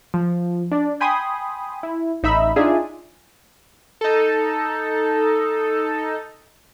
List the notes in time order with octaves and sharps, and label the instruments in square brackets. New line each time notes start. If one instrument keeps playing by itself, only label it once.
[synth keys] F3
D4 D5
G5 G#5 B5 C6 D#6
E4
A1 D#4 E5 B5 E6
D4 D#4 F4 G#4 D5 E5
[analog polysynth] D#4 A4